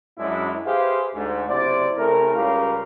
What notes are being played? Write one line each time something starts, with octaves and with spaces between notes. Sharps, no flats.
F#2 G#3 D4 E4
G4 G#4 B4 C5 E5 F5
D2 G#2
F#1 C3 E4 C5 D5
C#3 A3 C4 E4 A#4
C#2 C#3 G3 G4 A#4 F5